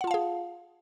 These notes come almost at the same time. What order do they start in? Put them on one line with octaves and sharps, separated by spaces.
F#5 F4 A5 F5 G#4